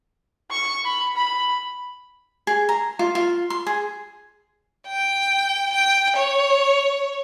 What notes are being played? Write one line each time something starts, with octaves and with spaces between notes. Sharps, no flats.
C#6
B5
B5
G#4
A#5
F4
F4
C6
G#4
G5
G5
C#5